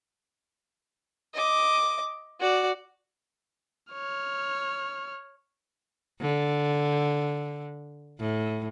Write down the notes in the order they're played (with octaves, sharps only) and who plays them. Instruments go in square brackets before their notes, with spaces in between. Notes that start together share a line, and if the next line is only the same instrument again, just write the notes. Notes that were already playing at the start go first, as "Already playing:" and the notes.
[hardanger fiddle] D#5 D6
F#4 D5
[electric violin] C#5 F6
[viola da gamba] D3
A2